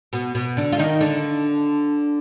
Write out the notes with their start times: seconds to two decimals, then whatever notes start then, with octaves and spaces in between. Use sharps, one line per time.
0.13 B2 B3
0.35 B2 B3
0.57 D3 D4
0.73 F4
0.79 D#3 D#4
1.00 D3 D4